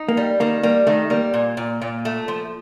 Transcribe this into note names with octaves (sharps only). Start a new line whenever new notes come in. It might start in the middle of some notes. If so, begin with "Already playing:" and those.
Already playing: D#4
A#3
G3
D#3 A#3
G3 A#3
D#3 A3
G3 A#3
A#2
A#2
A#2
A3
F3